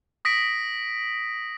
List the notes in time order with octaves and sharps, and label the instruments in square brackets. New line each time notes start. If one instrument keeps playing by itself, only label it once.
[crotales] D#6 A#6 B6 D7